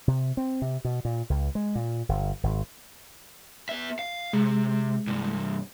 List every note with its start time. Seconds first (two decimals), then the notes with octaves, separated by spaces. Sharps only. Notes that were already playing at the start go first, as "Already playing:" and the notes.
0.08 C3
0.37 C4
0.62 C3
0.85 B2
1.05 A#2
1.30 C#2
1.55 G#3
1.75 A#2
2.09 G1
2.43 G#1
3.69 B3 E5
3.99 F5
4.33 C3 G#3
5.07 C2 G2